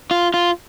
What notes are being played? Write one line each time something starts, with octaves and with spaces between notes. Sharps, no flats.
F4
F4